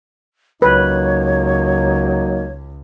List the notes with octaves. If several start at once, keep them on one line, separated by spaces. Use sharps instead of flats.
C#2 F#3 A#3 D#4 B4 C#5